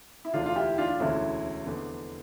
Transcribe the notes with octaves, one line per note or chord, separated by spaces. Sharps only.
E4
E1 D2 D3 D4 F4
F4
E4 G4
D4 F4
E1 D2 D3 C#4 E4
F1 E2 D3